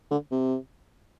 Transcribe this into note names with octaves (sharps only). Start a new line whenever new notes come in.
D3
C3